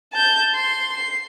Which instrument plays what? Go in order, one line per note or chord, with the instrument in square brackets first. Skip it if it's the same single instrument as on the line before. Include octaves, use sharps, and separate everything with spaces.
[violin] A5 G6
C6
C7